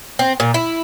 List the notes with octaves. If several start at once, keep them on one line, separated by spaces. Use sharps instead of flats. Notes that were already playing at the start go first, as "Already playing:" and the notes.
C4
A#2
E4